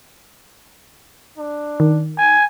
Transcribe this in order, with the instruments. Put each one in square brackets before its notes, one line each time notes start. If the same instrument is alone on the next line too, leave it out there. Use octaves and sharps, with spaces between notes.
[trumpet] D4
[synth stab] D#3
[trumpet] G#5